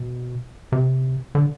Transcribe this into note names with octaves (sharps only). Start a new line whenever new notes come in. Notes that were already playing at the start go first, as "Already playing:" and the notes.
Already playing: B2
C3
D3